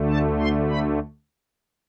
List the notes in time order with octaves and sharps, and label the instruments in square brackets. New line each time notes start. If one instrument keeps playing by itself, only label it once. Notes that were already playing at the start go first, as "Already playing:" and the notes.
Already playing: [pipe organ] D2 D3 A3
A5
C6
B5